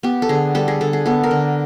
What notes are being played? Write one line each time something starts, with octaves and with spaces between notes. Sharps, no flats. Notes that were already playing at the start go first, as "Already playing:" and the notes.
B3 G4
A4
D3 G#4
G3 A4
G#4
D3 A4
G#4
B3 A4
A#4
D3